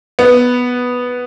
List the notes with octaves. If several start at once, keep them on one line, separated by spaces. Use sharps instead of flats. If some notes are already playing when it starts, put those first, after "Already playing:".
B3